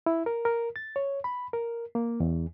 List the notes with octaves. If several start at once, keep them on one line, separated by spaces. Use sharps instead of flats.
E4
A#4
A#4
A6
C#5
B5
A#4
A#3
E2